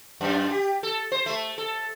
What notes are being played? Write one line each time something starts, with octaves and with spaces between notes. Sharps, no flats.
F#2
G4
A4
C5
A3
A4